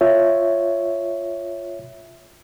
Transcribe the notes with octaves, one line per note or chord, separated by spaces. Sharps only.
F4 C#5 E5